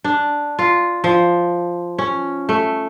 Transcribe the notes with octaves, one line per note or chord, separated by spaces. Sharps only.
D4
F4
F3
C#4
A3